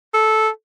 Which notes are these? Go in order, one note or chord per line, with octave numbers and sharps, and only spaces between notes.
A4